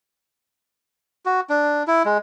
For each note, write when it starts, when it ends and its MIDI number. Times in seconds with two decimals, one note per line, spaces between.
1.25 1.40 66
1.49 1.83 62
1.87 2.03 64
2.05 2.18 56